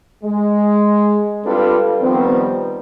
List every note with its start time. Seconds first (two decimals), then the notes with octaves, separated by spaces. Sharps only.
0.24 G#3
1.45 G3 C4 D4 F4 A4 B4
2.01 D#3 F3 G3 B3 C4